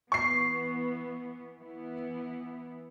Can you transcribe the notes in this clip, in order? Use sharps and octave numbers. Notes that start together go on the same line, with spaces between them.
E3 B3 C#6 C7
E3 B3 E4